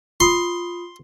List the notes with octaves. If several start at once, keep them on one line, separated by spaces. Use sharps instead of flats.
F4 B5 C6 D#6